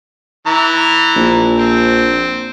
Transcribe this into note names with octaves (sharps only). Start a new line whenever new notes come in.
E3 A#5
A#1
C4